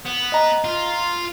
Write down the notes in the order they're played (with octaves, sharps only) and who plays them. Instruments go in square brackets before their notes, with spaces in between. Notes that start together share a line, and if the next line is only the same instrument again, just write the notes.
[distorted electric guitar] B3
[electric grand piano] D#5 A#5
[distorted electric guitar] F4